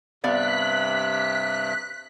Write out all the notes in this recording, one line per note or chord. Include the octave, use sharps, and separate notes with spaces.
G2 C3 B3 D5 F5 F#6 B6